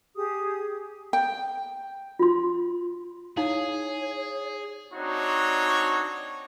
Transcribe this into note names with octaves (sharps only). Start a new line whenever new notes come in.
G4 G#4 D#6
G5
F4 C6
D#4 E4 G#4 C#5 F5
C4 D4 D#4 F#4 C#5